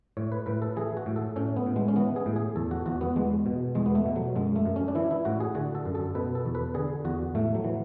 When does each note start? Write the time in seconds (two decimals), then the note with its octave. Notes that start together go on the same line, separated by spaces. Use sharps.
0.17 A2 C#5
0.32 B4
0.46 A2 B4
0.62 A4
0.76 E3 G#4
0.97 F#4
1.06 A2
1.16 A4
1.36 A2 C#4
1.57 B3
1.67 A2
1.76 G#3
1.88 C#4
1.96 E3 B3
2.16 G#4
2.26 A2
2.36 G#4
2.56 E2 A4
2.71 F#4
2.86 E2 F#4
3.01 B3
3.16 E2 G#3
3.46 B2
3.75 E2 G#3
3.86 B3
3.95 A3
4.06 B2
4.16 F#3
4.35 F#2 G#3
4.56 A3
4.66 F#2
4.76 C#4
4.88 D4
4.95 E3 E4
5.11 E4
5.25 A2 F#4
5.40 G#4
5.55 D3 F#4
5.75 A4
5.85 F#2
5.95 A4
6.15 B2 B4
6.35 A4
6.45 E2
6.55 B4
6.74 D3 G#4
7.05 E2 F#4
7.35 A2 A3
7.55 F#3
7.64 E3